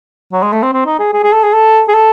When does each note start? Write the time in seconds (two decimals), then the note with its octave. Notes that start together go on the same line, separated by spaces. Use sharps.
0.32 F#3
0.42 G#3
0.52 A3
0.63 C4
0.73 C4
0.86 D#4
0.99 G#4
1.13 G#4
1.23 G#4
1.33 A4
1.43 G#4
1.53 A4
1.88 G#4
1.94 A4